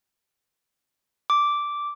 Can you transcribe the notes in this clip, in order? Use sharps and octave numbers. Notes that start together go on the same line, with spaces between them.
D6